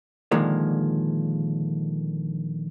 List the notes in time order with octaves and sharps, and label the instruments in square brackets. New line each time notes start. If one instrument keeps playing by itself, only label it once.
[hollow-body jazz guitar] A#2 D3 D#3 F3 G#3 A#3